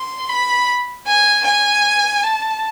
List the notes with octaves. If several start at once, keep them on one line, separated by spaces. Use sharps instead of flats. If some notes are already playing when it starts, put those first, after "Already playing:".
Already playing: C6
B5
G#5
G#5
A5